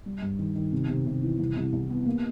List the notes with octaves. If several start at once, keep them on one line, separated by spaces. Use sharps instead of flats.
G3
G2
D#3
D#3
C3
C3
C3
E3
C2
C2
C2
B3
A#3